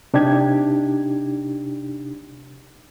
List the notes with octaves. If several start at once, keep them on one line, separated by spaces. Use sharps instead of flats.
C3 D4 D#4 G4 G#6